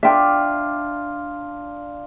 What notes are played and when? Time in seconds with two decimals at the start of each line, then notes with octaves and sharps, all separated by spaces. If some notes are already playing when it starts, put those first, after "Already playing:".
0.03 D4 F4 E5 G5